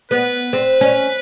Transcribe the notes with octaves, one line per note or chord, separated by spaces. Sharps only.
B3 B4
C4
C#4